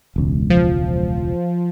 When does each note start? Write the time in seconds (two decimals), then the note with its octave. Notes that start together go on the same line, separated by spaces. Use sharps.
0.16 E1 C#2
0.50 F3